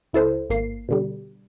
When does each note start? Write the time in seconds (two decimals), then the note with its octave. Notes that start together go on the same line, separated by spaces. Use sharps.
0.13 C#2 E4 A4 C5
0.50 G#1 A#3 C7
0.89 B2 D3 G3